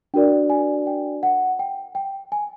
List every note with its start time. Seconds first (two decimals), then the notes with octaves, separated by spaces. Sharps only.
0.14 D4 F#4 A#4 D5 G5
0.50 G#5
0.87 G5
1.23 F#5
1.59 G5
1.95 G5
2.32 G#5